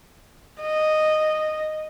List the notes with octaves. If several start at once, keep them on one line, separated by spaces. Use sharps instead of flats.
D#5